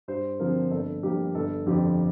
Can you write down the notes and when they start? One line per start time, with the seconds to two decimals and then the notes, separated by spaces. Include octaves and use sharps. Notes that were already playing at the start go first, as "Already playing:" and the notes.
0.08 G2 C5
0.40 D3 F3 C4 A#4
0.71 G1 A4
1.03 G2 F3 A#3 G4
1.35 G1 A4
1.66 F2 D3 F3 G4